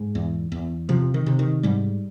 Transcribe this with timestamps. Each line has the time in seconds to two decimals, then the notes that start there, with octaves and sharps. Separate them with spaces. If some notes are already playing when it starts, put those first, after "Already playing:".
Already playing: G#2
0.15 E2
0.52 E2
0.89 C3 F3
1.14 D#3
1.26 C3
1.39 D#3
1.63 G#2 G3